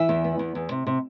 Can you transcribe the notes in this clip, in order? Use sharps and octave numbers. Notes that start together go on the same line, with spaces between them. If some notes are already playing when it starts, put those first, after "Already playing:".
Already playing: E3 E5
E2
B3
E2
E2
C3
C3